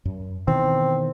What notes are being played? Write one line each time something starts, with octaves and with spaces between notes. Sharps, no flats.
F#2
B2 D#3 E3 C4